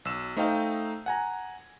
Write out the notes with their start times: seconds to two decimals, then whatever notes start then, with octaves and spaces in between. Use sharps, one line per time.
0.05 B1 E6 E7
0.37 A3 D#4 C5 D#5 F5 G5
1.06 F#5 G#5 A#5